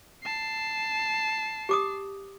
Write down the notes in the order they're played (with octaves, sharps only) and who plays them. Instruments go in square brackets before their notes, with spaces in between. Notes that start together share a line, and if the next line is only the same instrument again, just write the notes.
[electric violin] A5 C7
[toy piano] G4 D6 D#6